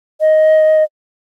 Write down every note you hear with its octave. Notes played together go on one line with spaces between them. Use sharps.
D#5